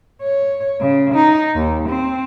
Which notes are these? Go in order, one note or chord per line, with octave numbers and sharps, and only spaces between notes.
C#5
C#3
D#4
D#2
C4